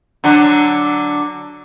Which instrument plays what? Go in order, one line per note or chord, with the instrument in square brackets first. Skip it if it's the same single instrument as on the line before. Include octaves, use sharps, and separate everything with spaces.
[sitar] D3 F#3 F#4